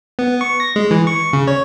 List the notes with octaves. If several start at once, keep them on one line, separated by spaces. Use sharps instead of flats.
B3
C#6
A#6
G#3
E3
C#6
C#3
C#5